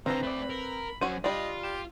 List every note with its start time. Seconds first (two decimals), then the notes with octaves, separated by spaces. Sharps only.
0.06 D3 C4 E4 A4 B4 F5 A#5
0.23 A3 D5 B5
0.50 A#4
1.01 F#2 C#4 F#4 C5 D#7
1.24 G3 D4 F4 D#5
1.63 G4 E7